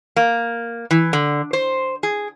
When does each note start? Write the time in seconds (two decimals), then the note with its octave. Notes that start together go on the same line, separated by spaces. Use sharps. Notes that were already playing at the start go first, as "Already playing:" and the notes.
0.16 A#3
0.91 E3
1.13 D3
1.53 C5
2.03 G#4